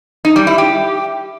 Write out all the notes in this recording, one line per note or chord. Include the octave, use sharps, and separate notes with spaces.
D#4
G3
E4
G4